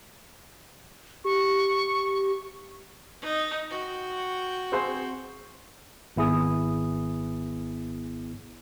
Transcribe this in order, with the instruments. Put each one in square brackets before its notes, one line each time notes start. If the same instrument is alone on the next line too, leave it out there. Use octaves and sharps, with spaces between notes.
[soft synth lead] G4 [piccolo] C#6
[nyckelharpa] D#4
F#4 G5
[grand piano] C4 G#4 C5
[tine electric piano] G#1 B3 E4 G#4 D#6